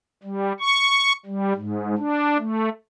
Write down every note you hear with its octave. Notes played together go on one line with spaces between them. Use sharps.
G3
C#6
G3
G#2
D4
A3